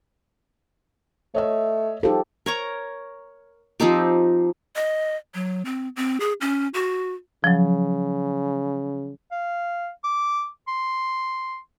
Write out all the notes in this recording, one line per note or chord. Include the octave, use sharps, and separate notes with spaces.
A3 C#5 D#5 E5
F3 D#4 G4 A4
A#4 C#5 A#5
F3 C4 D#4 G4
D#5
F#3
C4
C4
G#4
C#4
F#4
C#3 F3 F#3
F5
D6
C6